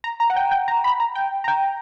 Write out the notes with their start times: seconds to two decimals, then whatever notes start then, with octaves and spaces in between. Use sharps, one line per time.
0.04 A#5
0.20 A#5
0.30 F#5
0.36 G5
0.51 G5
0.68 A#5
0.84 B5
1.00 A#5
1.15 G5
1.44 A#5
1.48 G5